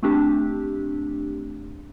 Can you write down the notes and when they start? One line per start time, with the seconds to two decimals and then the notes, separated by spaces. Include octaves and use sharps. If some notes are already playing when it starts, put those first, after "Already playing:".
0.03 A3 C4 D4 G4